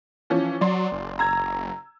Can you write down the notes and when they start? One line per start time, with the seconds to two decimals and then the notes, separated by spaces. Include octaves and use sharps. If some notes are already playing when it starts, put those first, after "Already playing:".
0.30 E3 F3 C#4
0.61 F#3 D5 C6
0.92 F#1
1.19 A#5 E6 G#6